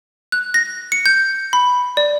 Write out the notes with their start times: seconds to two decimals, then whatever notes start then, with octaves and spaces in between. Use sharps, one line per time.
0.32 F#6
0.54 A#6
0.92 C#7
1.06 G6
1.53 B5
1.97 D5